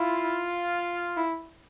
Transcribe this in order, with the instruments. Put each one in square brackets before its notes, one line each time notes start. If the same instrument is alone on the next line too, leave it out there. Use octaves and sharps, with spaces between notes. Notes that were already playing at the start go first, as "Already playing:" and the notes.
Already playing: [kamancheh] E4 [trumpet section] F4
[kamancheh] E4